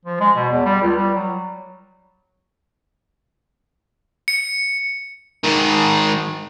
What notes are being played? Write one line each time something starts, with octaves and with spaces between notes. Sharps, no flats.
F3
G#3
B2
E2
G3
C#2
G3
F#3
C#7
G#2 D#3